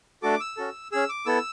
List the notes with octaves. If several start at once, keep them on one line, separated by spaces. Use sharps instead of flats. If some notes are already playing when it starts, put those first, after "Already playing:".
A3 D4 F#4 A4 D6
E6
C#4 F#4 A4
C#4 G#4 E6
D6
B3 E4 A4 E6